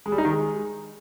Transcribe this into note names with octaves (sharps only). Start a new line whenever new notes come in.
G#3
G3
D#4
D#3
G#3